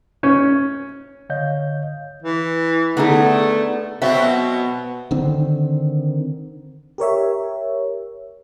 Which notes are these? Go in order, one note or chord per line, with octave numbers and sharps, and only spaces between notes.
C#4
D3 C#5 D#5 F5 G6
E3
D3 A3 B3 D#4 G#4
B2 F#3 B3 C4 F#4 E5
D3 D#3 C4
G4 A#4 C#5 E5